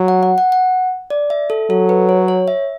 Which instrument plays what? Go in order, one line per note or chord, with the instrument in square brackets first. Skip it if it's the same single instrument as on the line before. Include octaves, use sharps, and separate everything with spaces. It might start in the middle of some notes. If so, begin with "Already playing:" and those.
Already playing: [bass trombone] F#3
[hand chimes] F#5
F#5
F#5
F#5
D5
E5
A4
[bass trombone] F#3 [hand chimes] A4
[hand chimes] B4
C#5
C#5
E5